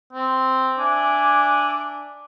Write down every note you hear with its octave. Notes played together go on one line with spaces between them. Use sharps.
C4
D4 E5 G#5 D6